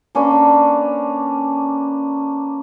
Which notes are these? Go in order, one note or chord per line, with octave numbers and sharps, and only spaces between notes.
A#3 C#4 D4 B4